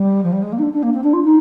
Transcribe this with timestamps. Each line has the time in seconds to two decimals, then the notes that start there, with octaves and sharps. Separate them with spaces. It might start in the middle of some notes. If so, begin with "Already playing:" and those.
Already playing: G3
0.23 F3
0.32 G3
0.42 G#3
0.52 A#3
0.58 D#4
0.62 D4
0.73 D4
0.82 A#3
0.93 C4
1.03 D4
1.13 F4
1.24 D#4